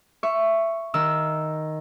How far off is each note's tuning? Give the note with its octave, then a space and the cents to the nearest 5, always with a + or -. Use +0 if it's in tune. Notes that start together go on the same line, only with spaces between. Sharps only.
E5 +15 C#6 +0
D#3 +0 E6 +0